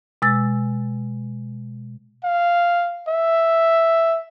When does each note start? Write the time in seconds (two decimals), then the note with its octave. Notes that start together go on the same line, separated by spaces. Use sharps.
0.22 B2 G#3 E6 A6
2.24 F5
3.08 E5